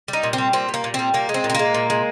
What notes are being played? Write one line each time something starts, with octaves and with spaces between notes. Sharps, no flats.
G3
D#4
A#2
C4
G3
A#2 C4
G3
A#3
A#2
G3 C4
A#2 A#3
G#3
C4
A#2
C4
G#3 A#3
A#2
G#3